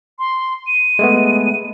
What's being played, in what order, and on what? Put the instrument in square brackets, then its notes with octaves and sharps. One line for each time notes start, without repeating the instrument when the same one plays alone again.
[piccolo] C6
D#7
[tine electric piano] G#3 A3 B3